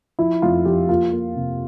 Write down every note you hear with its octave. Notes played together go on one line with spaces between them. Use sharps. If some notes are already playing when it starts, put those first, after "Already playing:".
F3 E4
F2 F4
F3 G4
A#3 F4
A#3
C3